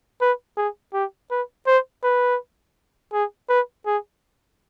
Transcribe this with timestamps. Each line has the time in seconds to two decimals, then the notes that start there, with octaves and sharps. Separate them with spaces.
0.21 B4
0.57 G#4
0.93 G4
1.31 B4
1.67 C5
2.04 B4
3.13 G#4
3.49 B4
3.86 G#4